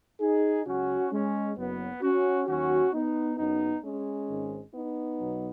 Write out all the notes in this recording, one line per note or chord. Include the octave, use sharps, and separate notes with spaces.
D#4 G#4
C#2 C#3 F#3 C#4 F#4
G#3 C#4
F#1 F#2 F#3 B3
C#4 F#4
D#2 D#3 F#3 C#4 F#4
B3 D#4
F#1 F#2 C#3 F#3 B3 D#4
G#3 C#4
G#1 G#2 D#3
B3 D#4
B1 B2 F#3